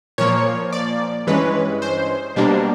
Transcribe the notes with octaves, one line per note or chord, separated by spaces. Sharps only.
A#2 F3 A#3 C#5
D5
G2 E3 G#3 C#4 B4
C5
B2 G3 A#3 D4